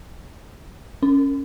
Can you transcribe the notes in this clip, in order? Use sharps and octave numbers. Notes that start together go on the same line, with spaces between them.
C#4